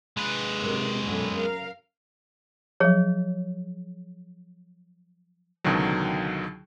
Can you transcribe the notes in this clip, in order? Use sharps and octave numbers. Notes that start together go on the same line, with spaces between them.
G#3 B4
F#2 C3 D#3
F#2 B2 D3
A#4 F5
F3 F#3 G#4 C#5
C#2 B2 D3 D#3 F#3